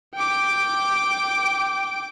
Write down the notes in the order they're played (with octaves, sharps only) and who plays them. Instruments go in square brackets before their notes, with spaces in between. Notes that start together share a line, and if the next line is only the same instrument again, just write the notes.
[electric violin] G5 D6